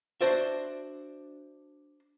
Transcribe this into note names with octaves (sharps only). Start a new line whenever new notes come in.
D4 F#4 C5 D5 E5